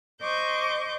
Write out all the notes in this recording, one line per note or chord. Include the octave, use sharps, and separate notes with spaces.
C5 D#5 C#6 D6 G6